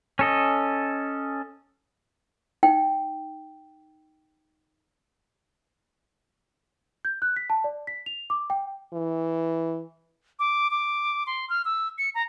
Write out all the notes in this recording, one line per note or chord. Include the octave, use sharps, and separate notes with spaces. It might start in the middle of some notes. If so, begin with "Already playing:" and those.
C#4 A4 D#5
D#4 G5
G6
F#6
B6
A5
D5
B6
F7
D6
G5
E3
D6
D6
C6
F6
E6
C#7
A#5